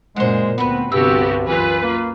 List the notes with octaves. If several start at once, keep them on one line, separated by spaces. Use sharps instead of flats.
F#2 A#2 C#3 G#3 C5 F#5
D2 B3 C4 F#4 B4
C2 G2 D3 B3 C4 F#4 G4 E6
F#2 E3 F4 B4
A#3